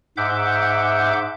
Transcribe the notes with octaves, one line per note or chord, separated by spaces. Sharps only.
G#2 E5 F#5 D6 G6